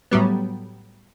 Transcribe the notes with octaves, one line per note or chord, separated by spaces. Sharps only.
A2 F#3 G3 B3